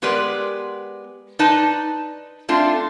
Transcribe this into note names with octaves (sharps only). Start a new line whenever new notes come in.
G#3 B3 G4 A#4 B4 D5
D#4 B4 D5 D#5 A5
A3 C4 D4 F4